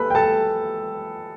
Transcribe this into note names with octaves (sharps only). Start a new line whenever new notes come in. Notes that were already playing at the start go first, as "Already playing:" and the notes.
Already playing: A4 B4 B5
G5
A4 A5